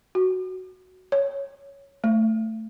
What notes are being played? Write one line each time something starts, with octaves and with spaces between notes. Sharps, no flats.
F#4
C#5
A3